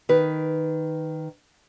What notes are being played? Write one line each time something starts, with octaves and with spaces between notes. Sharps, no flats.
D#3 B4